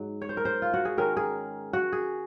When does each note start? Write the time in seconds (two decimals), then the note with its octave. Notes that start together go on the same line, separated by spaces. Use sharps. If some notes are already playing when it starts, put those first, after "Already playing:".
Already playing: G#2 F#3
0.22 C#5
0.29 C5
0.37 A#4
0.45 C5
0.62 F4
0.74 F#4
0.85 G#4
0.97 D#3 G#3 C#4 A#4
1.17 G#4
1.73 F#4
1.92 G#4